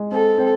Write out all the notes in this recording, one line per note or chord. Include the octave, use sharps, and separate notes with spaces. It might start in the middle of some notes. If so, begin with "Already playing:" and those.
Already playing: G#3
C4 A4
C4